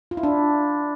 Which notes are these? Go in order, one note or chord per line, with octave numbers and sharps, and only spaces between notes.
F4
E4
D4